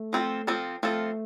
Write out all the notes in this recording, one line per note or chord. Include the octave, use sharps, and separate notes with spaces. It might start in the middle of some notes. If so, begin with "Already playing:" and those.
Already playing: A3
F3 C4 F4 A4
F3 C4 F4 A4
F3 A3 C4 F4 A4